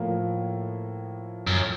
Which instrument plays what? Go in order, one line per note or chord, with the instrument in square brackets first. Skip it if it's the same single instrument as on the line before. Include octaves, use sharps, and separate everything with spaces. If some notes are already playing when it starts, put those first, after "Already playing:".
Already playing: [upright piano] A2 F3 A#3
[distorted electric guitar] F#2